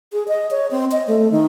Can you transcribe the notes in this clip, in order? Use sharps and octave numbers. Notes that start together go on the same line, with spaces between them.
G#4
D#5
C#5
C4
D#5
A3
D#3